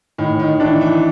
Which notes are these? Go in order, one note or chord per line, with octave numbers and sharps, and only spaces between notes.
A2 D#3
D#3
E3 D4
E3